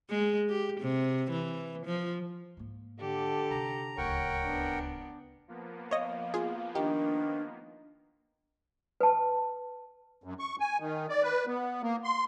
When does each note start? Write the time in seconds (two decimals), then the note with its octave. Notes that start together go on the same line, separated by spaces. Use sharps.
0.10 G#3
0.49 G4
0.80 C3
1.31 E3
1.86 F3
2.57 G#2 A#3
2.99 D3 G4 A4
3.51 C3 D#4 A#5
3.98 D1 C#2 A#4 C#5 F#5 G5
4.43 B3 D4
5.48 F3 A#3 B3
5.91 C#5 D#5 F5
6.34 F4 G#4
6.75 D#3 D4 G4
9.01 B4 A5
10.24 F#2
10.39 C#6
10.60 G#5
10.79 D#3
11.09 D5
11.23 B4
11.47 B3
11.82 A#3
12.04 C6